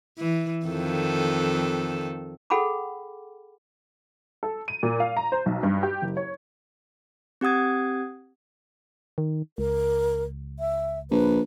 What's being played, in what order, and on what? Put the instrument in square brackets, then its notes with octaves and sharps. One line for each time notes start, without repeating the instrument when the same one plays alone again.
[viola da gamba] E3
F2 D#3 A4
[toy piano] G#4 A4 F#5 G5 B5 D6
[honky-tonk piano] A4
D#7
A#2
F5
A#5
C5
B1
G2
G4
F#1
C#5
[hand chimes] C4 G4 F#5 D#6 G#6
[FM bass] D#3
[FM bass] C#2 [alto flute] A#4
[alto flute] E5
[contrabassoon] A#1 [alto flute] B4